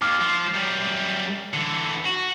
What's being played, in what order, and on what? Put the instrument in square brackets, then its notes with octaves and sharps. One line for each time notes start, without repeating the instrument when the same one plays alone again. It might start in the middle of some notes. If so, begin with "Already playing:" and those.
[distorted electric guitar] D#2 [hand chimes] D6 F6
[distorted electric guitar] F3
F#2 G3
[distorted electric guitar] D3 E3 [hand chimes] C#7
[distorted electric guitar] F#4